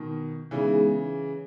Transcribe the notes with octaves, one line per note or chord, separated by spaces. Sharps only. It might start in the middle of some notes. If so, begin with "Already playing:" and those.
Already playing: B2 D#3
C#3 E3 G#3 B3 D#4 G#4